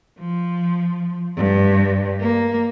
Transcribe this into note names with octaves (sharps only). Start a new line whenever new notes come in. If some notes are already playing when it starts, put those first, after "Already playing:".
F3
G2
A#3